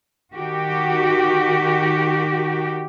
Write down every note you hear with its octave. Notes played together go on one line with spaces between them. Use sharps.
D#3 F#4 G4